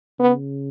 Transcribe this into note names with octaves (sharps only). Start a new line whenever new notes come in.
C#3 B3